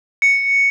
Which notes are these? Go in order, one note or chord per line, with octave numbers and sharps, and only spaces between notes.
C#7